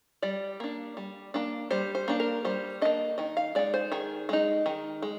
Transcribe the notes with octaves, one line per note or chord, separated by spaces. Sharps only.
G3 D5
A#3 D4
G3
A#3 D4
G3 C5
C5
A#3 D4
A#4
G3 C5
A#3 D4 D#5
D#3 D#5
F5
G#3 D#4 D5
C5
D#3 G#4
G#3 D#4
D#3
G#3